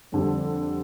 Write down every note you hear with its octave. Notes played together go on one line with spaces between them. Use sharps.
F2 D3 G3